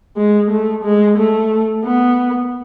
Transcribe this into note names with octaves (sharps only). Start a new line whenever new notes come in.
G#3
A3
G#3
A3
B3